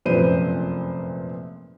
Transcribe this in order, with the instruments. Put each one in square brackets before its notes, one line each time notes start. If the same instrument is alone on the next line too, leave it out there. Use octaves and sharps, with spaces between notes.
[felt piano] F1 F#2 A#2 B4 C5 D#7